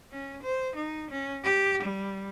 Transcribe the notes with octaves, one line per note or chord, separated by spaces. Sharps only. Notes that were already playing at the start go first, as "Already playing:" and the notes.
C#4
C5
D#4
C#4
G4
G3